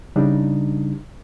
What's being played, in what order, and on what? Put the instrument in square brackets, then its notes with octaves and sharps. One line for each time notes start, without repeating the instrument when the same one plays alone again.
[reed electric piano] C#3 G3 D4 D#4